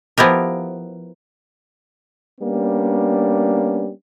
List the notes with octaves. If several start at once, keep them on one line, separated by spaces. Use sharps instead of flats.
F3 B3 E4 G4 A#4
G3 A#3 B3 C#4 D4